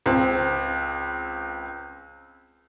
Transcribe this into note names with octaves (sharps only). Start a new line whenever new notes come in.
C#2 C4